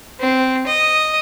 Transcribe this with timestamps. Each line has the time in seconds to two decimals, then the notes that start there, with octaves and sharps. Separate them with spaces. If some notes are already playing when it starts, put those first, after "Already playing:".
0.20 C4
0.67 D#5